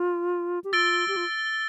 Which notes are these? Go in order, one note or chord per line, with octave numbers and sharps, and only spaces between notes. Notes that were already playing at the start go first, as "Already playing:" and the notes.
Already playing: F4
G4
F4 E6 A6 D7 G7
G4
F4